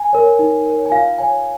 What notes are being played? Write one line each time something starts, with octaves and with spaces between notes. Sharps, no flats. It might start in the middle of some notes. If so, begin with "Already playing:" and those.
Already playing: G#5
A#4 C#5
D#4
A#4 C#5
G#5
F4 F5
C#5 G#5